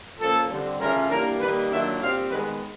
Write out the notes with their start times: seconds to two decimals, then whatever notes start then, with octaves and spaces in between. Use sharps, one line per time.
0.19 A#2 F3 A#3 C#4 A4
0.50 D3 G3 C4
0.79 C#3 E3 A3 C#4 F4 A#4
1.10 E3 G3 A#3 D4 A#4
1.40 D#3 G3 A#3 D#4 B4
1.70 D#3 F#3 A#3 D4 F4 E5
2.01 A#2 G3 C4 F5
2.31 D#3 G#3 B3 B4